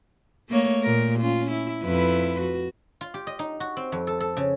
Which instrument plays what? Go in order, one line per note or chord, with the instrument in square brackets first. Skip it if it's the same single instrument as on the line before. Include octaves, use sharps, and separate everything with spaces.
[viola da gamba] A3 A#3 C#5
A#2 A#4
C#4 F4
E4
F2 E4 B4
F#4
[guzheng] F4
G4
D#5
D#4
F#4
C4
F2
A4
A4
C#3